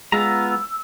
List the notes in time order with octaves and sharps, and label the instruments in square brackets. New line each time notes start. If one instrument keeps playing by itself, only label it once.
[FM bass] G#3 [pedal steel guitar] B3 F4 A#5 [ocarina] E6